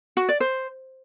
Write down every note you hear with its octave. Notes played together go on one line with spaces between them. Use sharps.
F#4
D5
C5